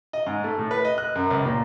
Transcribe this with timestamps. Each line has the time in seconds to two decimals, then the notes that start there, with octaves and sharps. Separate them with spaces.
0.13 D#5
0.26 G#2
0.44 A3
0.59 A2
0.71 B4
0.85 D#5
0.98 F#6
1.15 F#2
1.30 C#2
1.46 A#2